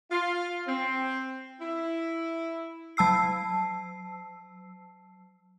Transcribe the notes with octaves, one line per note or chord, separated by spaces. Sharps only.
F4
C4
E4
F#3 A5 E6 C7